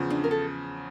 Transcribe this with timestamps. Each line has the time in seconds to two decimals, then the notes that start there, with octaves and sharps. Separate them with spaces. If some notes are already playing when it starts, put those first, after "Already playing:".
Already playing: E2 C#3 F3
0.10 D4
0.24 A#4
0.31 A4